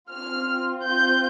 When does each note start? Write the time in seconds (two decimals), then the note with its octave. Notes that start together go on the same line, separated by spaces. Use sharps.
0.11 C4 F4 F6
0.84 G6